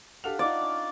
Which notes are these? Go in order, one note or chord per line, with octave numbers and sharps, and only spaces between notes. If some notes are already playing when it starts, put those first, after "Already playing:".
D4 G4 A4 F5 F#5 F7
D#4 F4 D5
C#4